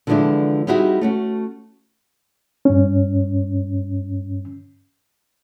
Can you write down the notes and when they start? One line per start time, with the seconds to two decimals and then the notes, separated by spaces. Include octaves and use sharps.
0.07 D3 E3 F3 G#3 D4 E4
0.67 G3 C4 D#4 E4 F#4 G#4
1.01 A3 C#4 F#4
2.65 G2 C#4